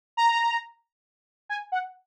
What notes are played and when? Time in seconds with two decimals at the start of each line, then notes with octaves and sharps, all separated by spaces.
0.17 A#5
1.49 G#5
1.72 F#5